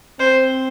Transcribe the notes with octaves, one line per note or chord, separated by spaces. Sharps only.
C4 C5